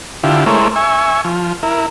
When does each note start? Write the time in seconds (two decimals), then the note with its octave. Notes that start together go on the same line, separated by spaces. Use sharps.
0.24 D3 E4 F4 G4
0.46 G#3 A3 E4 A#4 C5 C#5
0.76 E5 G#5 C#6
1.25 F3
1.63 E4 A#4